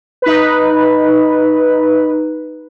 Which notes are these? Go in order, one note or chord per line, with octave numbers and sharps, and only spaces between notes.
D#4 B4